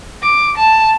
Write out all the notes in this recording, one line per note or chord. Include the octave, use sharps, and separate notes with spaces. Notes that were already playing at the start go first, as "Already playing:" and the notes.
D6
A5